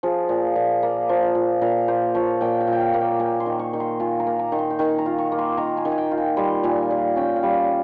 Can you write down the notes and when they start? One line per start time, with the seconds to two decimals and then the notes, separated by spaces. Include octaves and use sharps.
0.03 F3 G#4
0.29 A#2
0.56 A#2
0.83 A#3
1.09 F3
1.35 A#2
1.62 A#2 A#4
1.88 A#3 C5
2.14 F3 C#5
2.41 A#2 G5
2.60 G5
2.67 A#2
2.73 G5
2.81 F5
2.94 A#3
3.00 G5
3.20 A#3 G#5
3.40 C6
3.46 D#3
3.59 C#6
3.73 D#3
3.80 C6
4.00 F4 G#5
4.20 A#5
4.26 A#3
4.39 A#5
4.52 D#3
4.59 C6
4.70 G5
4.79 D#3 G#5
4.98 A#5
5.06 F4
5.18 C#6
5.32 A#3
5.39 C6
5.57 D#3 A#5
5.77 G#5
5.85 D#3
5.92 G#5
5.98 G5
6.11 F4
6.17 G#5
6.37 G3 C6
6.63 A#2 G#5
6.91 A#2
7.16 C#4 G5
7.36 F5
7.43 G3